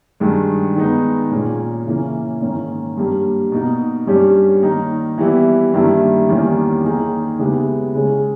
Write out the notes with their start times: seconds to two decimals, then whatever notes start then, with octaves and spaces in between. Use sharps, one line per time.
0.20 G2 D#3 G#3
0.75 D#3 G#3 B3 D#4
1.32 A#2 A#3 C#4 G#4
1.86 C#3 E3 A#3 C#4
2.41 G#2 D#3 A#3 C#4
2.97 G2 G3 A#3
3.52 B2 A#3 D#4
4.07 G2 G3 C#4 G4
4.62 D#3 A#3 D#4
5.18 E3 G3 B3 E4
5.74 G2 D#3 G3 A#3 E4
6.29 E2 D#3 G3 A#3 C#4
6.84 D#3 A#3 D#4 G#4
7.39 C#3 G#3 B3 E4 G4
7.95 C#3 G#3 C#4 G#4